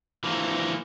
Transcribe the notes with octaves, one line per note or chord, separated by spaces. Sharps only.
E3 F3 A#3